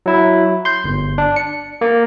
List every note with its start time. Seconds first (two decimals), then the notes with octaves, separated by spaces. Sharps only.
0.06 F#3 E4
0.65 C6 G6
0.84 G1
1.18 D4
1.36 C#7
1.81 A#3